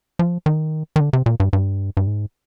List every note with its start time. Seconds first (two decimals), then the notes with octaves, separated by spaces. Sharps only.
0.19 F3
0.46 D#3
0.96 D#3
1.00 D3
1.13 C3
1.26 A#2
1.40 G2
1.53 G2
1.97 G2
2.07 G#2